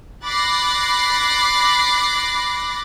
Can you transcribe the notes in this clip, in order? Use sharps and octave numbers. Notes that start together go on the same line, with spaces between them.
B5 D6 F#6 A6 A#6 C7